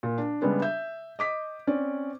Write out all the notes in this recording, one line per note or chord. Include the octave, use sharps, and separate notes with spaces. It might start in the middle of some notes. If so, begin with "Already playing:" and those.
A#2
D4
C#3 G3 G#3 B3 D4
E5 G6
D#5 D6 B6
C4 C#4 D5